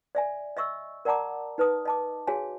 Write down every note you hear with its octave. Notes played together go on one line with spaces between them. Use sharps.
D5 E5 G#5
D#5 E5 C#6 E6
A#4 D5 F#5 A5 A#5 D6
D#4 B4 A5 D#6
D#5 A5 D6
F#4 G#4 C#5 F5 G#5